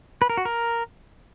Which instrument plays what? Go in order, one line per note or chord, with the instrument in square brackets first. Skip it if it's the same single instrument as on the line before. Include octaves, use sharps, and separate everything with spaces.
[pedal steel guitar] B4
A#4
F#4
A#4